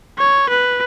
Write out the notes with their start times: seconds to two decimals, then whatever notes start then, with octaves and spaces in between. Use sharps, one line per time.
0.19 C#5
0.49 B4